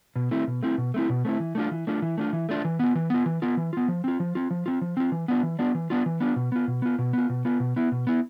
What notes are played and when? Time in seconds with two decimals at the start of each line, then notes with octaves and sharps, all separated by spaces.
0.16 B2
0.31 A3 C4 E4
0.48 B2
0.63 A3 C4 E4
0.78 B2
0.94 A3 C4 E4
1.09 B2
1.25 A3 C4 E4
1.40 E3
1.55 A3 D4 F4
1.71 E3
1.87 A3 D4 F4
2.02 E3
2.17 A3 D4 F4
2.33 E3
2.49 A3 D4 F4
2.65 E3
2.79 B3 F4
2.95 E3
3.10 B3 F4
3.26 E3
3.42 B3 F4
3.57 E3
3.73 B3 F4
3.88 F3
4.04 C4 F4
4.20 F3
4.35 C4 F4
4.51 F3
4.66 C4 F4
4.81 F3
4.97 C4 F4
5.12 E3
5.28 B3 D4 F4
5.43 E3
5.59 B3 D4 F4
5.75 E3
5.90 B3 D4 F4
6.06 E3
6.20 B3 D4 F4
6.36 B2
6.52 B3 F4
6.68 B2
6.82 B3 F4
6.99 B2
7.13 B3 F4
7.30 B2
7.45 B3 F4
7.60 B2
7.76 B3 E4
7.92 B2
8.07 B3 E4